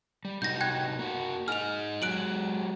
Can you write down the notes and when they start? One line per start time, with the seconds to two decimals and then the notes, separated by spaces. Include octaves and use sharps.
0.25 G3
0.42 C3 D#4 F#4 G6 A#6
0.61 G5 F#6 G#6
0.99 A#3 F#4
1.48 D#4 G#4 F6 F7
2.02 F#3 G#3 F#6 D7 F#7